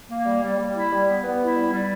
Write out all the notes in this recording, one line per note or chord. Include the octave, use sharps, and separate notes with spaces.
A#3
G3
G3
G3
E4
G3
B3
B3
E4
G3
G3